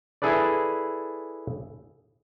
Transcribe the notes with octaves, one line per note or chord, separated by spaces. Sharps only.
E4 G#4 A4 B4 D5